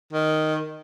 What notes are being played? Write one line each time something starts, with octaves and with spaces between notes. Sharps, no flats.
D#3